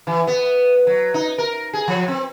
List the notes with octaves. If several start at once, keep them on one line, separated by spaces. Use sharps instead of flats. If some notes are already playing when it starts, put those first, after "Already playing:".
E3
B3
F#3
D#4
A#4
G#4
F3
C4